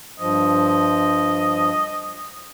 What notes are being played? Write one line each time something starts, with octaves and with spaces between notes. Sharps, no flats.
G2 F3 D#5
D#5